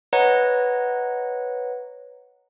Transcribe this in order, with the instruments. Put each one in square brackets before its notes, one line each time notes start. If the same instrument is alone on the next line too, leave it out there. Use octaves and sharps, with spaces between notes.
[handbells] B4 C#5 D#5 F#5 A#5